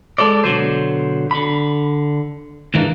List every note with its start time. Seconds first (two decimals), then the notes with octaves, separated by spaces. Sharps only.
0.18 G#3 A4 C5 D5
0.44 B2 D3 F#3 C5
1.31 D3 B5
2.74 D#2 G#2 E3 G#3 A#3 D4